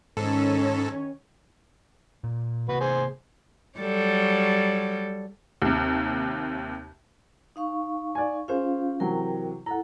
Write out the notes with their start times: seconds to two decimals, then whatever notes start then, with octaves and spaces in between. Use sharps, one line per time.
0.17 G#2 D#3 C#4 A4 C#5
2.24 A#2
2.68 C3 A#3 F#4 B4
2.80 G#4 C5
3.79 F#3 G3 A4
5.62 D#2 C3
7.56 D#4 F5 C#6
8.15 D5 G#5
8.48 C#4 F4 G#4 C5 F5
9.00 C3 E3 F#3 A#4 G5
9.66 E4 A4 F#5 A#5